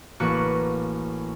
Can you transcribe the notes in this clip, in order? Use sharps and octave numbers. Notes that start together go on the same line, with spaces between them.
A1 A#3 F#4 B4 F#6 C#7